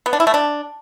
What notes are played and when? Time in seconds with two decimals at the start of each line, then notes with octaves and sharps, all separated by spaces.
0.06 B3
0.13 D4
0.20 E4
0.27 A3
0.34 D4